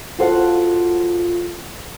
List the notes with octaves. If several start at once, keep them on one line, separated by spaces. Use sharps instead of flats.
F4 F#4 A4 C5 D#5 F#5